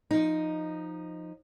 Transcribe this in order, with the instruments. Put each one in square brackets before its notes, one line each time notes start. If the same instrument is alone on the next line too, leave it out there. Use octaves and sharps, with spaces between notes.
[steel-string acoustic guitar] F3 D#4